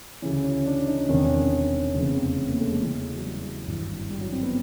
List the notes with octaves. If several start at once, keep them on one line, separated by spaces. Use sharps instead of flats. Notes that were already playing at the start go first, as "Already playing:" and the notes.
D2 C#3 E3 C#4
C#4
D4
D#4
E1 E2 C3 D#3 C#4
D4
C#4
F1 E2 C#3 C4
C4
B3
A#3
A3
G#3
E2 C#3 E3
F#3
G3
F#3
G#1 G2 E3
G3
F#3
C4
B3